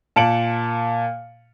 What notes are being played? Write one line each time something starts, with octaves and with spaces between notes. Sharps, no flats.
A#2 A5 C#7 D7 F#7